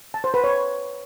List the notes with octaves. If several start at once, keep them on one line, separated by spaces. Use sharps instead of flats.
A5
C5
B4
C#5